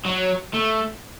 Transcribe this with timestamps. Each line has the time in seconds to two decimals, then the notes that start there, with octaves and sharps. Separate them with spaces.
0.05 F#3
0.54 A3